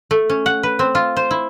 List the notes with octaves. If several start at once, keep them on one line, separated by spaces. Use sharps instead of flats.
A3
C#4
F#5
B4
C4
F4
C5
E4